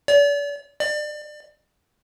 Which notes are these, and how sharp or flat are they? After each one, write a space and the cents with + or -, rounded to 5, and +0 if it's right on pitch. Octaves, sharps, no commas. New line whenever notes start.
D5 -40
D5 +30